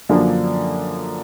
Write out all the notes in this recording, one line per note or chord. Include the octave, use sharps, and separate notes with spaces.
F#2 D3 F3 A#3 D4